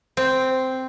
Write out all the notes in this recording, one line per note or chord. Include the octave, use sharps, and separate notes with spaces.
C4